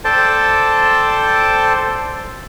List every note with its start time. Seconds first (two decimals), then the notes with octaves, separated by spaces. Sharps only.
0.05 A4 C5 D5 G5 A5